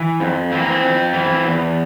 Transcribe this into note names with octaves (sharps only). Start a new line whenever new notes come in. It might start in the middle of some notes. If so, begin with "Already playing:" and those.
Already playing: E3
F2
E3 C4
A#3
C4
F2
E3
E2